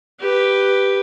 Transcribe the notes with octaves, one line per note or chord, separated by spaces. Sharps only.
G4 B4